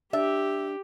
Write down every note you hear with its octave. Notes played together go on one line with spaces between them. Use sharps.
D4 G4 E5